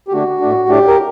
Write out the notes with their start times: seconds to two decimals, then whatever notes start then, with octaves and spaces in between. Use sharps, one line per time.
0.08 G4
0.12 D3 A3 D4 F#4
0.40 A2 A3 D4
0.69 A2 A3 D4 G4
0.87 A#4